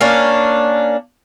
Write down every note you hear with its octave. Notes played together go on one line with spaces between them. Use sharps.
A#3 C#4 D4